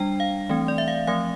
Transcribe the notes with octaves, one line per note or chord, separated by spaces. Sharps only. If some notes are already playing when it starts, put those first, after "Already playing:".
Already playing: G3 D4 G5
F5
E3 A3 C4
D5
E5
F5
F3 A3 C4 F5